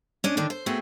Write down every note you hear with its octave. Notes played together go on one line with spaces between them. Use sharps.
C#4 D4 D#5
D3 D#3 D4
C5
A3 B3 C4 F#4 G#4